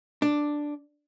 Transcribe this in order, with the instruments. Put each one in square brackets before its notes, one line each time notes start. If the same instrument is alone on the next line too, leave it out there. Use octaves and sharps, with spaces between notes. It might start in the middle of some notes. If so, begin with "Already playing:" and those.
[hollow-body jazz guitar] D4